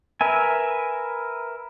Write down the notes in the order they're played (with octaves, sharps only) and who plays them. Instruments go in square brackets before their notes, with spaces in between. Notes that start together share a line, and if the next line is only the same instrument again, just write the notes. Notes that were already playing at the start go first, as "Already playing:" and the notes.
[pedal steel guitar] A#4 B4 E5 G#5